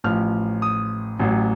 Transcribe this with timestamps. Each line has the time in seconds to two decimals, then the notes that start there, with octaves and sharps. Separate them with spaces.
0.04 A1 A2 F3 F6
0.62 D#6
1.19 A1 A2 F#3